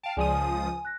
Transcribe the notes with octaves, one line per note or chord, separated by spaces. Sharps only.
F5 G5 A5 D7
C#2 F3 G#4 D5 G#5 D#6
G#5
F#6 A#6